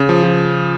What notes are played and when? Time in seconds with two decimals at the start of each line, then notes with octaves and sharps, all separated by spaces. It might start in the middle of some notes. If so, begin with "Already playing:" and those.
Already playing: C#3
0.09 F3
0.23 F3